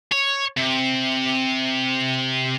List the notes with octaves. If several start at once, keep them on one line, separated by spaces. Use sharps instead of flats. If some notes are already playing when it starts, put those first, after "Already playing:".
C#5
C3